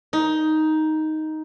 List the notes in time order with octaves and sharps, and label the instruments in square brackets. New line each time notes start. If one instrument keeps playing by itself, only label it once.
[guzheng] D#4